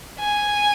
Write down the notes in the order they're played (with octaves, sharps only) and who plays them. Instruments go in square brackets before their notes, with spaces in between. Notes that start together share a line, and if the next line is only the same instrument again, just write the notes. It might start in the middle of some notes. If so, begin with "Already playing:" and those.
[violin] G#5